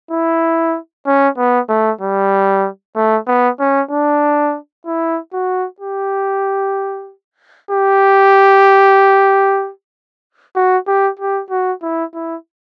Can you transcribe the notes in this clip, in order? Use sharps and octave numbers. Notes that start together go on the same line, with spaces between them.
E4
C#4
B3
A3
G3
A3
B3
C#4
D4
E4
F#4
G4
G4
F#4
G4
G4
F#4
E4
E4